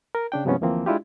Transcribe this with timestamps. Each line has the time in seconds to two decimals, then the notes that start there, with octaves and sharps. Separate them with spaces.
0.15 A#4
0.32 C#3 D4 G5
0.45 G2 C3 F3 G#3 B3 C#4
0.61 D2 E3 F3 A#3 C4
0.86 G#3 D4 E4 F4 G4